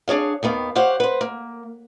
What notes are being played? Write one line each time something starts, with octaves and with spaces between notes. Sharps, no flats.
D4 G#4 C#5 F5
D#2 D#3 B3 F5
G4 C5 C#5 F5 F#5
B4 C5
A#3